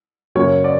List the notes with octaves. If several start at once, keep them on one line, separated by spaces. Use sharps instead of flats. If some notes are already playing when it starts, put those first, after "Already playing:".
F#2 C#3 F#3 A#3 C#5
D5